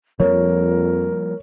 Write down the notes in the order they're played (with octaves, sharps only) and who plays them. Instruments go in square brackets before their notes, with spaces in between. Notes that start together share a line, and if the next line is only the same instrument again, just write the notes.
[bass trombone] F2 [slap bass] F3 G3 A#3 [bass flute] A#4 [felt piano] C#5